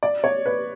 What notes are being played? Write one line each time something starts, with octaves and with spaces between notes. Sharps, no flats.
D5
C#5
B4